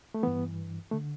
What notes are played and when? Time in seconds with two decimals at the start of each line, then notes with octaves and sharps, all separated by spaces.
0.14 A3
0.23 G2 E3 B3
0.92 D3 A3